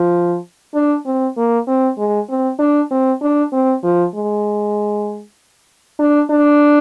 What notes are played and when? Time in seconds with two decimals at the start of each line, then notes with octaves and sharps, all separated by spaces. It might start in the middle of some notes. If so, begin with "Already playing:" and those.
Already playing: F3
0.74 D4
1.06 C4
1.37 A#3
1.68 C4
1.98 G#3
2.29 C4
2.59 D4
2.91 C4
3.22 D4
3.53 C4
3.83 F3
4.14 G#3
5.99 D4
6.30 D4